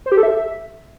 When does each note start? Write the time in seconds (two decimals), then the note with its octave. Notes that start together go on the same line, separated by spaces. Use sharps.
0.06 C5
0.12 G4
0.17 A4
0.23 E5